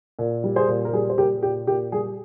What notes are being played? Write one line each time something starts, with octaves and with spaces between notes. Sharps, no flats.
A#2
G3
G#4 C5
A#2
A#4
G3 G#4
C5
A#2 G4 A#4
A#2 G4
A#2 G4
G3 G#4